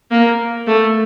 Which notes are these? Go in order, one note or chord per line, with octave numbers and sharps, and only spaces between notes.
A#3
A3